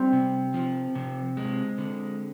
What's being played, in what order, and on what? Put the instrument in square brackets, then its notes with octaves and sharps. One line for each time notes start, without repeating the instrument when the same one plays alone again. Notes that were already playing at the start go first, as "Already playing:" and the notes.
Already playing: [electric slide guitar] G3 [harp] C4
[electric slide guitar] C3
F3
C3
G#3
D3